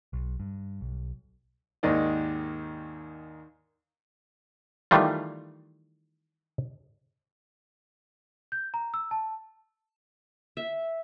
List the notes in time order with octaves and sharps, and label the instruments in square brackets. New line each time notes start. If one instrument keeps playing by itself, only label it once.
[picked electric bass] B1
G2
B1
[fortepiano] D#2 G#2 D#3 D5 D#5
[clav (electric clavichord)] D#3 E3 G3 A3 F4
[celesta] G6
A#5
E6
A5
[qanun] E5